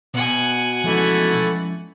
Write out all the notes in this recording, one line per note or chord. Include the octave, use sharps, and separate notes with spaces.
B2 F#5 G#5
E3 F3 G#3 A3 C#4